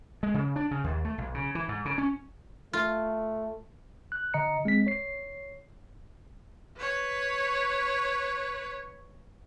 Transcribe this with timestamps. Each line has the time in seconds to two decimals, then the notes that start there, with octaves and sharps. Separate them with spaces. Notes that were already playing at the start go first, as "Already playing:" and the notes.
0.23 G#3
0.34 C#3
0.56 D4
0.71 C#3
0.84 D#2
1.05 A3
1.18 B1
1.34 C#3
1.55 E3
1.69 G#2
1.85 C#3
1.98 C#4
2.73 A3 F4
4.12 F#6
4.34 D3 D#5 A#5 C#7
4.65 G#3 C4 B6
4.87 C#5 C7
6.77 B4 C#5